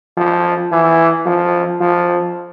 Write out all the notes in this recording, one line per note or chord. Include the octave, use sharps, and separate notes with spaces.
F3
E3
F3
F3